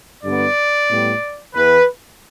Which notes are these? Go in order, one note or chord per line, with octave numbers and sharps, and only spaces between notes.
G2 D3 B3 D5
A2 G3 B3
E2 E3 B3 B4